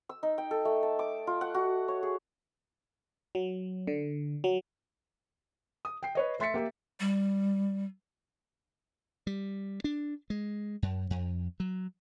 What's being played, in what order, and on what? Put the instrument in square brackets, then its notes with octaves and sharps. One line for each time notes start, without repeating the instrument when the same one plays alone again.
[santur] E6
D#4
G5
A4
A3
A5
D6
F4
F#5
F#4
C#5
G#4
[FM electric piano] F#3
D3
F#3
[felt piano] D#6
G5 C7
B4 C#5 D#5
A3 E5 C6 A6 B6 C#7
A#3 G4 A#4 E5
[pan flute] G3
[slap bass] G3
D4
G#3
F#2
F2
F#3